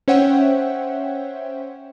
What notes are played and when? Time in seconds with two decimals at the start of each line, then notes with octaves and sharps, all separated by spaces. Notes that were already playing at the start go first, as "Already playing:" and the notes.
0.08 C#4 C5 C#5 E5 F#5 G5